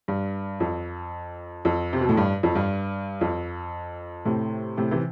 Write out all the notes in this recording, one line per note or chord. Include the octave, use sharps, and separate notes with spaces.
G2
F2
F2
C3
B2
A2
G2
F2
G2
F2
A2 C3
A2 C3
C3 E3